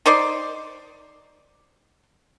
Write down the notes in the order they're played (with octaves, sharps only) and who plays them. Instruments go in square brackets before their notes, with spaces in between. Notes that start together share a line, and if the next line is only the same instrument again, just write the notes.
[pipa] D#4 C5 D5 C6